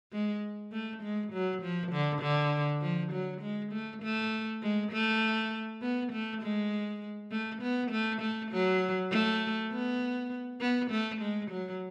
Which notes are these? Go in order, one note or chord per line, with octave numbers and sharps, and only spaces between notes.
G#3
A3
G#3
F#3
F3
D3
D3
F3
F#3
G#3
A3
A3
G#3
A3
B3
A3
G#3
A3
B3
A3
A3
F#3
A3
B3
B3
A3
G#3
F#3